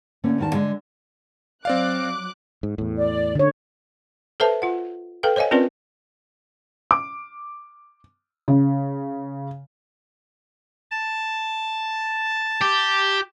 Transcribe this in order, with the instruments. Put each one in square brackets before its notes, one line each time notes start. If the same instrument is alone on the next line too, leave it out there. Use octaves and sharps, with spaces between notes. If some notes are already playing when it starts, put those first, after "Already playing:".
[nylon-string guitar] D3 A3 A#3 C#4
E2 D#3 A5
D3 G#3
[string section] F#3 D6 F#6 [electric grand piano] C4 D5 F5
[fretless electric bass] G#2
E2 A2
[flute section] D5
[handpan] D3 C#5
[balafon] A4 B4 C5 E5 A5
F4 F#5
A4 B4 F5 G5
C5 C#5 D#5 F5 G#5
C4 C#4 F4 A#4 B4 D5
[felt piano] D6
C#3
[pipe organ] A5
[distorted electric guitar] G4